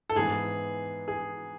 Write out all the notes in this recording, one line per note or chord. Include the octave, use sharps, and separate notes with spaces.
A4
G#2 E3 B3 G#4
G#4